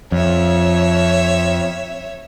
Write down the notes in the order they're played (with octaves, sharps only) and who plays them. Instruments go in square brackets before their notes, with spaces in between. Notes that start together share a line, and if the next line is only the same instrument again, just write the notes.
[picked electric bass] F2 [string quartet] C#5 E5